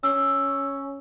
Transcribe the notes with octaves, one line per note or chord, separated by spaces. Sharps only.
C#4 E6